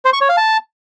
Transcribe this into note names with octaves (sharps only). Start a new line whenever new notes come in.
C5
C#6
C#5
F5
A5